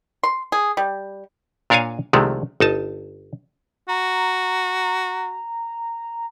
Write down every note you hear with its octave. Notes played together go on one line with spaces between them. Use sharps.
C6
G#4
G3
A#2 D4 A#4 C#5 F5 G#5
C2 C3 D#3 F3 G#3 A3
G1 D#4 A5
F#4 A#5